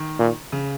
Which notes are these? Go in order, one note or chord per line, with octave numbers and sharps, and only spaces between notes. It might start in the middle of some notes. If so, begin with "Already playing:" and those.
Already playing: D#3
A#2
C#3